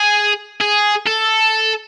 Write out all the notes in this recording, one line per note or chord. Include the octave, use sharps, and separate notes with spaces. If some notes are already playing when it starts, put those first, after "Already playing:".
Already playing: G#4
G#4
A4